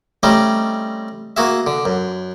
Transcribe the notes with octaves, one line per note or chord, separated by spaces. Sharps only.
G3 A3 C4 C#4 D#4
A#3 F#4 G#4 E5
D3
F#2